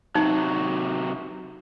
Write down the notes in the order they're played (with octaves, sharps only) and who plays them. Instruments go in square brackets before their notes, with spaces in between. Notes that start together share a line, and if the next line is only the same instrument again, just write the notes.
[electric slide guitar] C3 F#3 [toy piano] D#4